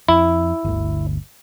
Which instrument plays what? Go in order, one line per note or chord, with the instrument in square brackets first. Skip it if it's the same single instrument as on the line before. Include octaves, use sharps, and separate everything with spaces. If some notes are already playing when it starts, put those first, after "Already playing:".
[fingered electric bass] F2 [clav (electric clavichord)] E4
[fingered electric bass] G1 D2